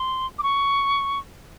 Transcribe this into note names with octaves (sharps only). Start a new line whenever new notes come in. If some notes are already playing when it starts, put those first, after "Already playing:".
Already playing: C6
D6
C#6